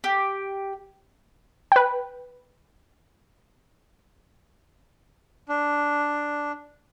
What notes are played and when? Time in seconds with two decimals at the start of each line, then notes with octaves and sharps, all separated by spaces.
0.04 G4
1.72 B4 G5
5.49 D4